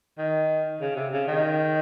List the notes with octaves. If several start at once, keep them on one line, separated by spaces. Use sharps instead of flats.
D#3
C#3
C3
C#3
D#3